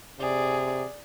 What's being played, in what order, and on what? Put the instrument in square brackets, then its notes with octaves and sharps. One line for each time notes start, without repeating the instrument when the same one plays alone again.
[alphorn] C3 [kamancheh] G#4 D5